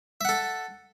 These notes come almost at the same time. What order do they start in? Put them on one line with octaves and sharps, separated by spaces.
E5 F#5 A4